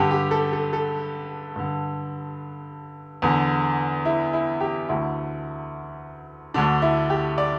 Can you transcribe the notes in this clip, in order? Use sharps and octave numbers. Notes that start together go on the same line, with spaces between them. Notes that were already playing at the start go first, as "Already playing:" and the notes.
Already playing: G2 D3 G4
G4
A4
A4
A4
G2 D3
E2 D3
E4
E4
G4
D2 D3 E4
D2 D3 D4
E4
G4
D5